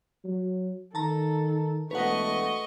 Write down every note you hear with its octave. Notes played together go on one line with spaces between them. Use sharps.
F#3
D#3 A4 A5 A#5
E1 A3 B4 D#5 F#5 C#6